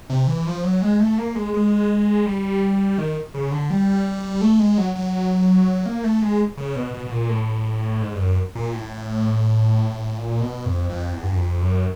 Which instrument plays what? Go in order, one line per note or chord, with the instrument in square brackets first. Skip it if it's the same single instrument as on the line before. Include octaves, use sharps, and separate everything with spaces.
[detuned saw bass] C3
E3
F3
F#3
G#3
A3
A#3
G#3
G#3
G3
D#3
C#3
D3
G3
A3
G#3
F#3
F#3
A#3
A3
G#3
C#3
B2
B2
B2
A#2
A2
G#2
G2
F#2
A#2
A2
A#2
B2
F2
F2
E2
G2
F#2
F2
F#2